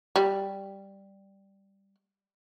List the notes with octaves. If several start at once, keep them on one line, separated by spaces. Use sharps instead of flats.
G3